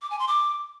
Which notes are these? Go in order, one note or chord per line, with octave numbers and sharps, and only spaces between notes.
D6
G#5
C6
D6